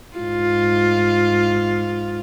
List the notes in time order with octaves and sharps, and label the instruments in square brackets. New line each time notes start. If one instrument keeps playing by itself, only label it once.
[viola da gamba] G#2 F4